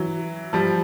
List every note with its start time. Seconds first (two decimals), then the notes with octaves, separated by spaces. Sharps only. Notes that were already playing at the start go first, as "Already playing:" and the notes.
Already playing: E3 F#3
0.53 F3 G3